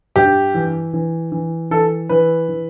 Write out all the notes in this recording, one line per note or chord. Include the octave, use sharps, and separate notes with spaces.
G2 G4
E3
E3
E3
E3 A4
E3 B4
E3